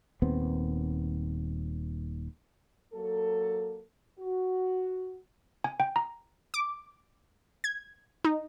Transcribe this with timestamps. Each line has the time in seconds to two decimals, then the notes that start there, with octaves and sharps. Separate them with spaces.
0.22 D#1 D#2 B3 C4
2.93 F#3 A#3 A4
4.19 F#4
5.64 G#5
5.80 G5
5.96 A#5
6.54 D6
7.64 G#6
8.24 D#4